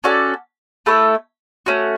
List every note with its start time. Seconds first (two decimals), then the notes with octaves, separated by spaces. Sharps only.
0.04 C#4 F#4 A4 D5
0.86 A3 E4 A4 C#5
1.66 A3 C#4 F#4